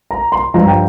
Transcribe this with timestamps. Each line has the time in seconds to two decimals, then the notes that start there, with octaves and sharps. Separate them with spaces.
0.11 A#5
0.32 C6
0.54 G2 F3 A#5
0.67 G5